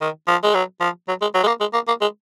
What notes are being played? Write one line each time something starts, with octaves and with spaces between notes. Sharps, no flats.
D#3
F3
G#3
F#3
F3
F#3
G#3
F#3
G#3
A#3
G#3
A#3
A#3
G#3